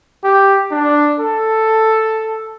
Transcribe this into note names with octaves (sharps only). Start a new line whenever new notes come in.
G4
D4
A4